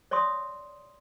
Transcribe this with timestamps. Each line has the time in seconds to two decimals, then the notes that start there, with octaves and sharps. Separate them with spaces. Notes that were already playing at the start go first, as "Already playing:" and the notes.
0.11 C#5 D5 E5 C6 D#6